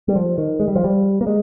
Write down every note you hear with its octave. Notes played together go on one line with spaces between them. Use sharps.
G3
F3
D#3
G#3
G3
F3
G3
A#3
G#3